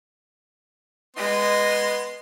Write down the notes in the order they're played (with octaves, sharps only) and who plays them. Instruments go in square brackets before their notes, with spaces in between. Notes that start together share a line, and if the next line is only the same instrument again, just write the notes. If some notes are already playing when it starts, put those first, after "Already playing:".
[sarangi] G#3 [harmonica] B3 C6